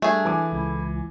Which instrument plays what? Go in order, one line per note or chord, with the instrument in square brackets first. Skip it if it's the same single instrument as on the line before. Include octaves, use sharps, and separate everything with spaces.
[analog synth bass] G3 [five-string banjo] A3 G#4 [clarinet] D4
[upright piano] E3 G#5 D6
[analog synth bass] C#2 [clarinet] E4